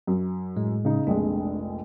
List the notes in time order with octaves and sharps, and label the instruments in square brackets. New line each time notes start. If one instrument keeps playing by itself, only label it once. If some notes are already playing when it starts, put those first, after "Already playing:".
[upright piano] F#2
[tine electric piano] A2 G#3
[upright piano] C#3 D#4
[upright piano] F1 A#1 G#3 [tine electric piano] D4